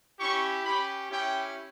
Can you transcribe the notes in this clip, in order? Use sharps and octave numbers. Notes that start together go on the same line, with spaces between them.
C#4 E4 G4 C#6
C#4 G4 B5
C#4 E4 G4 G5